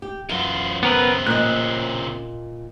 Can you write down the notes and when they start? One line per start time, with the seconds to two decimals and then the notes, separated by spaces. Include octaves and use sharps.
0.02 G4
0.29 F#2 E3 F4
0.83 C#3 B3 C4 A#4 B4
1.27 A#2 D#5 F#6